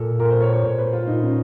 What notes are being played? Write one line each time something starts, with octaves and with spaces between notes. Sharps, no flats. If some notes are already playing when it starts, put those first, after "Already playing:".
Already playing: A#2 A4
A#2 A#4
C5
C#5
C#5
A#2 C5
B4
F4
A#2 D#4
C#4